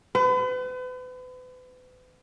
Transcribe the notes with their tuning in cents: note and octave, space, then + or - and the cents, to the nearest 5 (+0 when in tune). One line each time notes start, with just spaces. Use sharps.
B4 +40